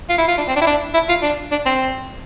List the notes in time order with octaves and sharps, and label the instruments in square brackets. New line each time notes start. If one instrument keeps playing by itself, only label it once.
[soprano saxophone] F4
E4
F4
D4
C4
D4
E4
D4
E4
F4
D4
D4
C4